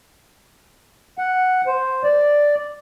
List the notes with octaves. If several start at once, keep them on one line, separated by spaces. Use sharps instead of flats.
F#5
C5
D5